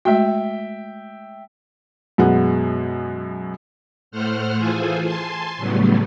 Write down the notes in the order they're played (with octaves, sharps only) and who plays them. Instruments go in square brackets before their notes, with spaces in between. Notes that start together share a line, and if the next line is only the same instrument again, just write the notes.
[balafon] G#3 A3 F#4 [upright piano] E5 G5
[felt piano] F#2 B2 G#3 B3
[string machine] A2 A3 C5 F#5 F6
E3 F4 G#4 A4 C5 G#5
G#5 A5 C6
A2 C#3 F#3 G3 A3 B3